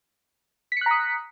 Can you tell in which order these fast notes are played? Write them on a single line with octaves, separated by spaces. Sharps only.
B6 C#7 F#6 A#5 D#6